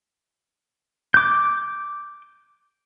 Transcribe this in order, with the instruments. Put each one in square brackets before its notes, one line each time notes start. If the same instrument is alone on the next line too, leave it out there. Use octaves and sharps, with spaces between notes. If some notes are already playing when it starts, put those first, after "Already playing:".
[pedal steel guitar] D6 G6